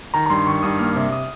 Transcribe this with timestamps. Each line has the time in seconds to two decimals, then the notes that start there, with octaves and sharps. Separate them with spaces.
0.14 D#3 A#5
0.26 A#5
0.30 G2 C6
0.47 D#3 C#6
0.63 G2 D#6
0.79 A#3 F6
0.96 C3
1.12 D#6